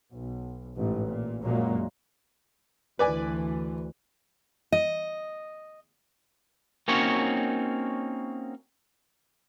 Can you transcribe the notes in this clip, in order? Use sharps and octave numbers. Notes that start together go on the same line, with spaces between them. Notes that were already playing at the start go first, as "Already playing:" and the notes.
B1
A1 G#2
A#2
A#1 F#2 A#2 F#3 G#3 A#3
D2 E3 B4 D5 G#5
D#5
A#3 C4 C#4 D#4 F#4 C#5